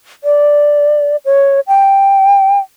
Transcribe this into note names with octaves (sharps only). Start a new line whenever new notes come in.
D5
C#5
G5